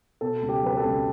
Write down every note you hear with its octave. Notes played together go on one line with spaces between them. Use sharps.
B2 A4
C#2
G4
F#3 B4
A4
C#2